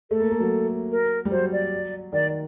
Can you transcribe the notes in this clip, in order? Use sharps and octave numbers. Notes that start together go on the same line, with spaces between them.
A3 A4
A#3
A#3
F#3
A#4
G3
F#3 C5
D5
D#3 D5